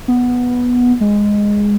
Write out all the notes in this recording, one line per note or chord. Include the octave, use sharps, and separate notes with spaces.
B3
G#3